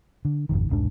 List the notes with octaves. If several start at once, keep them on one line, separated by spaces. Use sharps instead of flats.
D3
G#1 F2 D#3
E1 C2 G#2 D4